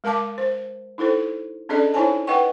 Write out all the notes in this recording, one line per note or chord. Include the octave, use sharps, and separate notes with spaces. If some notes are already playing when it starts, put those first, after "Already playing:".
G#3 A#4 F5 A5 D6
C5
D#4 E4 A4 C5
C#4 D4 G#4 A4 D5 D#5
D#4 E4 C5 C#5 G#5 A5
B4 D#5 F#5 G5 C#6